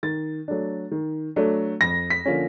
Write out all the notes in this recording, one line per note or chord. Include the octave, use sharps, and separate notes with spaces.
D#3 A6
F#3 A3 D4
D#3
F#3 A3 D4
F2 A#6
B6
D3 F3 A#3 C#4